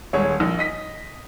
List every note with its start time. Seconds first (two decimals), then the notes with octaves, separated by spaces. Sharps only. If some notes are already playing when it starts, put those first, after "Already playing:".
0.13 D#1 G#3 C#5
0.40 A#1
0.59 D#5 B6